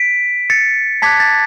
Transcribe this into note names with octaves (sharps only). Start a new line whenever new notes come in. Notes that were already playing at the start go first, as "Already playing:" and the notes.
Already playing: B6 D7
A6 C#7
A5 D6 F#6 G#6 B6
A6